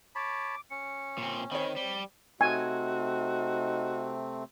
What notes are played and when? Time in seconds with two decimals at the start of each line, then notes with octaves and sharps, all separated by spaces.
0.15 C#5 A5 B5 D6
0.70 C#4 C#7
1.18 A#2 C4
1.51 D#3 C4 C#5 B5
1.76 G3 G7
2.41 C3 A3 C4 D#4 F#4 G#5